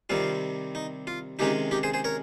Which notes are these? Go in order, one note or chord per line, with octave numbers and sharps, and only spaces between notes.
C3 D#3 G3 C4 F4
D#4
F4
C3 D#3 G#3 C#4 D#4 G4
D#4 G4
G#4 C5
G#4 C5
A#4 C#5